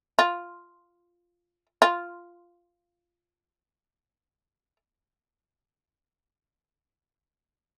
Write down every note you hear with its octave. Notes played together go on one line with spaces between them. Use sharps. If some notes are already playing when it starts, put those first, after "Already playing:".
F4
F4